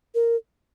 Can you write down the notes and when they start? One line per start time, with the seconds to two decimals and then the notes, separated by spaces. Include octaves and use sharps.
0.15 A#4